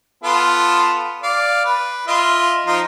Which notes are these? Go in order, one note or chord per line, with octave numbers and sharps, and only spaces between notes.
B3 F4 A4
D5 F5
B4
F4 D#5 E5
F3 D#4 F4